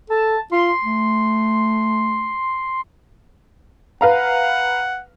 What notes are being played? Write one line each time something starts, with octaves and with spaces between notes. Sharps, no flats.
A4 A5
F4 C6
A3
B4 F5 F#5 A#5